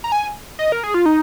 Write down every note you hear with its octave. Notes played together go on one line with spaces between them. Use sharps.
A#5
G#5
D#5
A#4
G#4
F4
D#4